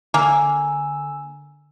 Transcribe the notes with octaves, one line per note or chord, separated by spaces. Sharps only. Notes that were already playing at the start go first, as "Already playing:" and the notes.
D3 A#3 G#5 E6